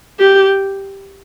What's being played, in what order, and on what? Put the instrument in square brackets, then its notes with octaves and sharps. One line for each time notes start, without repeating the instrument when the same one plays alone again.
[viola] G4